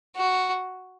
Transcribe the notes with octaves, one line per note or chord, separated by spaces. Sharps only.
F#4